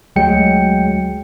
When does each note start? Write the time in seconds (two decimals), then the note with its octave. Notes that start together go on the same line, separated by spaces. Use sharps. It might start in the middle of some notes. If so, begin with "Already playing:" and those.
0.16 D2 F#3 G#3 G5 C#7